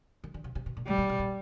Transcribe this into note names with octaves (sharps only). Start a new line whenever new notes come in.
D#3
D3
C3
C3
B2
A#2
B2 G3
A#2
B2
A#2